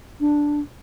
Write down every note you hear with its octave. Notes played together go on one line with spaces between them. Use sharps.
D4